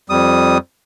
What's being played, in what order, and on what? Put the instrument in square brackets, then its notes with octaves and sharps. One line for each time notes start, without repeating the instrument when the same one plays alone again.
[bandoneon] F2 G3 D#6